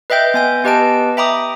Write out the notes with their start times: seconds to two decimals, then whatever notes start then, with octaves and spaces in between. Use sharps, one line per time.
0.10 B4 D#5 E5 G5 G6
0.34 B3 G#5 G6
0.64 B3 G4 B4 D#5 A5 D7
1.17 E5 G5 A#5 B5 D6 D#6